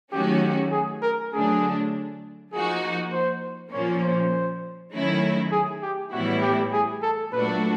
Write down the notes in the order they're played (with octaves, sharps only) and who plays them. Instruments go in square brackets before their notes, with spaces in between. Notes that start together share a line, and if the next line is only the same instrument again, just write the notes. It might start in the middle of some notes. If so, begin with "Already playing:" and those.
[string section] D#3 F#3 A3 C#4 F#4 [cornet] G4
[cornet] G4
G#4
A#4
[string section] D3 F#3 A3 D4 [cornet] G#4
[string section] F3 A#3 D#4 F#4 [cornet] G#4
[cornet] C5
[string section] A#2 F3 A#3 C#4 [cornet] C#5
[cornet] C5
[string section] D#3 F#3 A3 C#4 E4
[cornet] G#4
G4
[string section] A2 E3 G3 B3 E4 [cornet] F#4
[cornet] G4
G#4
A4
[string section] A#2 F#3 A3 D4 F#4 [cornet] B4